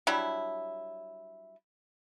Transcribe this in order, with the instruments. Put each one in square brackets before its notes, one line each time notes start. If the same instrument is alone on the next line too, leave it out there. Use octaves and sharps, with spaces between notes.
[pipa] F#3 G3 D4 E4